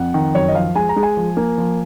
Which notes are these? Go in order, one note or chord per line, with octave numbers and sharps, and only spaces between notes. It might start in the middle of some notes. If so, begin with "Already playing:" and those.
Already playing: F2 F#5
D#3
F#2 C#5
D#5
F3 F5
G#3 G#5
A#5
G#3
G#5
F3
A#3
F3